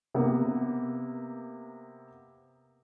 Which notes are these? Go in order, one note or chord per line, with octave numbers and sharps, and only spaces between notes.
C3 A#3 B3